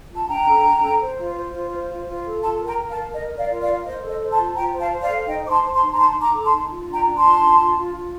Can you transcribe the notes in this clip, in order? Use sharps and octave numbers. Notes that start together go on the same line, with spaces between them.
F4
A5
D4 G5 A#5
A4
D4
A4
C5
F4
C5
F4
C5
F4
F4
A4
F4 A5 C6
A#4
G5 A#5
A#4
F5 A5
A#4
A#4 D#5
A#4
D5 F5
F4
D5 F5
A#4
C5 D#5
A4
D#5
C5
A5 C6
F4
F4 G5 A#5
C5
F5 A5
C5
D5 F5
A4
D#4 D#5 G5
C5 D6
A5 C6
C5
A5 C6
D#4
A#5
D#4 A5 C6
D#4
A#5 D6
A4
A5 C6
D#4
F4
D4
G5 A#5
D4
A5 C6
F4
D4
F4
F4
F4